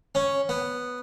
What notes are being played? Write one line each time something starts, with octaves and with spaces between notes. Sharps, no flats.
C#4
B3